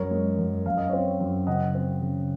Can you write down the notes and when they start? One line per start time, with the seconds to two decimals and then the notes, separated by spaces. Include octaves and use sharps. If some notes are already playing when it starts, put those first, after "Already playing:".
Already playing: F#2 A#4 C#5
0.11 G#3
0.38 F#2
0.66 F#2 F5
0.77 D#5
0.89 C4 C#5 F5
1.20 F#2
1.47 C#3 D#5 F#5
1.75 C4
2.02 C#3